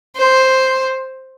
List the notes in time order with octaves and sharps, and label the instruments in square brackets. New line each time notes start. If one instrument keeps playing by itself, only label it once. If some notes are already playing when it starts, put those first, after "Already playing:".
[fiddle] C5